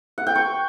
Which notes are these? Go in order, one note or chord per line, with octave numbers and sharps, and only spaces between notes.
F#5
G5
C#6